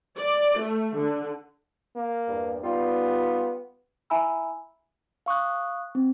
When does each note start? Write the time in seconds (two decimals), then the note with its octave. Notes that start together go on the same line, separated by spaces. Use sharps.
0.19 D5
0.61 A3
0.98 D3
1.96 A#3
2.28 E2 G2
2.63 G3 B3 D#4 F4
4.10 E4 E5 G#5 A#5 B5 E6
5.26 F5 C#6 D#6 F#6
5.95 C4